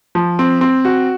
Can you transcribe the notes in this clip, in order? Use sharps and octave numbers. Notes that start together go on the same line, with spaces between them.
F3
C4
C4
F#4